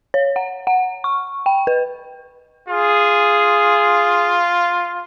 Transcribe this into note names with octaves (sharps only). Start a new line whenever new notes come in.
C#5
F#5
F#5
C#6
G5
B4
F4 G#4